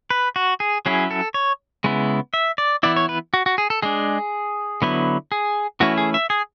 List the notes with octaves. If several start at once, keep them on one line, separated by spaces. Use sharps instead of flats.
B4
F#4
G#4
F#3 C#4 E4 G#4
A4
C#5
C#3 G#3 B3 E4
E5
D5
E3 B3 E4 D5
C#5
B4
F#4
F#4
G#4
A4
G#3 D4 G#4
D3 F#3 B3 E4
G#4
E3 A3 C#4 E4 F#4
G#4
E5
G#4